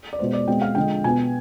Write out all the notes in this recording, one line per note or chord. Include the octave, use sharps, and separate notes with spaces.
D5
B2 G#3 B3 C5
D5
B2 G#3 C4 G5
F5
D3 F3 G#3 G5
B2 B3 G#5